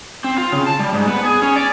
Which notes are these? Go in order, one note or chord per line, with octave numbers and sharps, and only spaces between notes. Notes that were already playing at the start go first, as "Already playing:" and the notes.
C4
F4
C#3
A5
G3
G#2
B3
G#4
C#4
D5